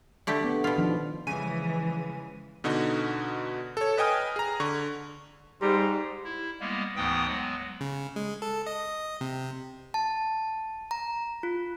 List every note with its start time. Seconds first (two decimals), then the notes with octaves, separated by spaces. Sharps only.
0.27 D3 A3 G4
0.44 B3
0.64 B2 F4
0.78 D#3 F3 D4
1.27 C#3 E3 F3 G#3 G#5 D#7
2.64 B2 D3 D#4 F#4
3.77 A4 C#5
3.97 B4 D#5 G5 G#5 D#6 F6
4.36 G#4 A#5
4.60 D3 C#6
5.61 G#2 G3 A#5 C6
6.24 E4
6.60 G3 G#3 A#3 B3
6.96 D2 G#2 E3 B3 G5 D#6
7.27 F#3 G#3 B3
7.81 C#3
8.16 G#3
8.42 A4
8.67 D#5
9.21 C3
9.94 A5
10.91 A#5
11.43 F4